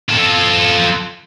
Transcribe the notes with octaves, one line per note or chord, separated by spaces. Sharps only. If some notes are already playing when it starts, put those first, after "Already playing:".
F4 A4